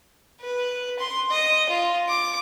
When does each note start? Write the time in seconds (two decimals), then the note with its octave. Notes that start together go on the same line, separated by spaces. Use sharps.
0.41 B4
0.99 C6
1.30 D#5
1.69 F4
2.09 D6